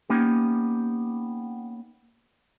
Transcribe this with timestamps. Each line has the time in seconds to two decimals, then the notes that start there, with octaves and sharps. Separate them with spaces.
0.10 A#3 B3 C#4 D#4 G4